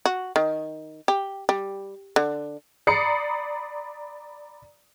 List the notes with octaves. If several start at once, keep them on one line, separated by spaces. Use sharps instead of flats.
F#4
D#3
G4
G3
D3
D5 A#5 B5 D#6 C7 C#7